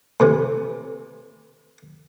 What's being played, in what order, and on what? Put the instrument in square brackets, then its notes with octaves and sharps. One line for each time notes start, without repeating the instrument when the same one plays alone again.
[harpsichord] A2 C3 E3